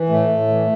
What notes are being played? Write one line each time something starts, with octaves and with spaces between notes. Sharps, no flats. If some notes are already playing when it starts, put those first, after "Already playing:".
Already playing: E3
A2 A3
A2
E3